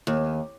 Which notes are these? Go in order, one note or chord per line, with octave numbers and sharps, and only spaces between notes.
D#2